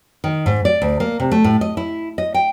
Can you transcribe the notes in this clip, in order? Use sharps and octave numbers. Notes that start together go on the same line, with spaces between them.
D#3
G#2
D5
D2
A#3
C3
A3
A2
D#5
E4
D#5
G5